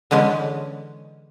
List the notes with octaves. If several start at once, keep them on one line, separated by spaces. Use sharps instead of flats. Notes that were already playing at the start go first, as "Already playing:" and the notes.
D3 E3 G#3 C#4